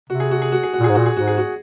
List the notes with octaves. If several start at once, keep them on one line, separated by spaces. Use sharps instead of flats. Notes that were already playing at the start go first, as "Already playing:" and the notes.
C3 F#4
G#4
F#4
G#4
F#4
G#4
F#4
A#2
G#2 G#4
A#2 F#4
G#4
G#2 F#4
G#4
F#4